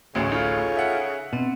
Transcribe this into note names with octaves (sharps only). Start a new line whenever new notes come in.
A1 D2 C#3 C#4
D#4 F4 A4 F5
E5 F#5
B2 B3 C4 D4